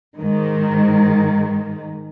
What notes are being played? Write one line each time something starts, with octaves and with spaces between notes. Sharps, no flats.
G#2 D#3